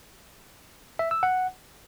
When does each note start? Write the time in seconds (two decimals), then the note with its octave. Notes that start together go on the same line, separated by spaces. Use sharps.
0.99 E5
1.11 E6
1.23 F#5